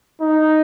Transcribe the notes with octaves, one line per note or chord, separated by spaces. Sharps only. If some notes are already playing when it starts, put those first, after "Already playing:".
D#4